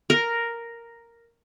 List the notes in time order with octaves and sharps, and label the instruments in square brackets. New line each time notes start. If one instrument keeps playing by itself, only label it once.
[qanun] A#4